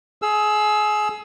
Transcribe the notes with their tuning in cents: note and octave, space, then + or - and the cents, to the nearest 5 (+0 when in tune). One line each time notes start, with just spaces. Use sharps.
G#4 +25 E6 +15